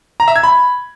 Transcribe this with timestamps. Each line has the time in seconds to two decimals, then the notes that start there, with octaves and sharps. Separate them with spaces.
0.20 A#5
0.28 E5
0.36 G#6
0.43 B5